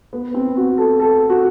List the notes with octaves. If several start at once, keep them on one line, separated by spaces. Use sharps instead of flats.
B3
C4
F#4
A4
A4
F#4